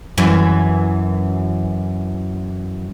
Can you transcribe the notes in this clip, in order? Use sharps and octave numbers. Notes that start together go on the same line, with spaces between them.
F#2 E3